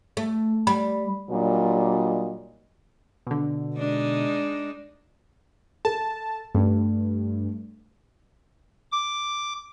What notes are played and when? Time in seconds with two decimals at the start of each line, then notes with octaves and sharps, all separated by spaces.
0.17 A3
0.67 G3 B5
1.31 A#2 F#3 G3 D4 D#4 D#5
3.27 B2 D3
3.77 G#3 D4 D#4
5.85 A4 A5
6.55 G2 A3
8.92 D6